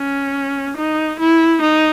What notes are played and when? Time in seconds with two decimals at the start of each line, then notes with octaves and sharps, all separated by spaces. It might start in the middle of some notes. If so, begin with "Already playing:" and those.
Already playing: C#4
0.77 D#4
1.19 E4
1.62 D#4